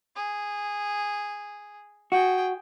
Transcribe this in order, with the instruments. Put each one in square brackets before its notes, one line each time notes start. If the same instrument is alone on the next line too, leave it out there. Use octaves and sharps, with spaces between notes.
[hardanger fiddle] G#4
[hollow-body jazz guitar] F#4 [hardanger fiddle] G#4 G5